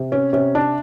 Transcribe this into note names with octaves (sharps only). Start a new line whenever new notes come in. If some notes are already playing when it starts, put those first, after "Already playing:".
Already playing: C3
C#4
C3 C#4
D4